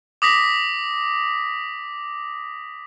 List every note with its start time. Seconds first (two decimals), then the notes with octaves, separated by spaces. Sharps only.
0.22 D6 D#6 A#6 B6